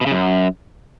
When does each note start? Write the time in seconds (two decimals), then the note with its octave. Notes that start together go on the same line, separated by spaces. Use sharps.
0.01 B2
0.06 C#3
0.12 F#2